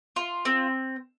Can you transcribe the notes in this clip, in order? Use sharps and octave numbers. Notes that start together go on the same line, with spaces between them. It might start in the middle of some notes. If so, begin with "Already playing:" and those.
F4
C4